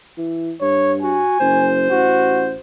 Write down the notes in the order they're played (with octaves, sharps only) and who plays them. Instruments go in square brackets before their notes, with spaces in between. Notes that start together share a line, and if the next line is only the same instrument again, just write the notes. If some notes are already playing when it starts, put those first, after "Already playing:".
[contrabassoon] E3
[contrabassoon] G2 [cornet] C#5
[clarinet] F#4 [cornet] G#5
[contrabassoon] F#1 [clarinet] C5
[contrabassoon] A1 [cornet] F#4